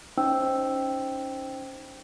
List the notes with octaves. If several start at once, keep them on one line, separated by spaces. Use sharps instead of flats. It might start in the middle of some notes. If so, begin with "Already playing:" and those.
C#4 D#4 C5 G5 E6